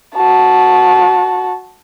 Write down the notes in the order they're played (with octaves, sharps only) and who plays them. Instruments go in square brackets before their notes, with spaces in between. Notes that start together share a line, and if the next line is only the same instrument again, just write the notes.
[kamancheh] F#4 A5